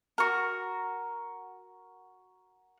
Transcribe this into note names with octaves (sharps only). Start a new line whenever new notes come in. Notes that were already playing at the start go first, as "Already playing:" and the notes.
F#4 A#4